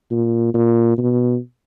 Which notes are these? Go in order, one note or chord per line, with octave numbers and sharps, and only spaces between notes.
A#2
A#2
B2